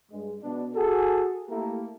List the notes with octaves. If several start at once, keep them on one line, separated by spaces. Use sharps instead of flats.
G2 G#3
B2 D4
F#4 G#4 A4
A3 A#3 E4 G4 A4 A#4